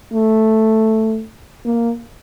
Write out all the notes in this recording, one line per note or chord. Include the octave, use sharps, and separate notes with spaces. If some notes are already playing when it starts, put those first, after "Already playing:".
A3
A#3